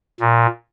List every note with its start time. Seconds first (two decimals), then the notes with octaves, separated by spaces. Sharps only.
0.20 A#2